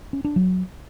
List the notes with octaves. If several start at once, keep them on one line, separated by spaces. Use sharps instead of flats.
C#4
D4
F#3